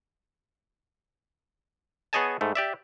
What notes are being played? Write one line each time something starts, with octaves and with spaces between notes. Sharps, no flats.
B3 G#4 C#5 D#5 G#5 A5
G#2 A3
G4 D5 E5